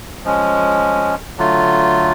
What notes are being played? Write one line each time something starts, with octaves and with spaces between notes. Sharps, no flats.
F3 G#3 C#4
D3 F#3 A3 F4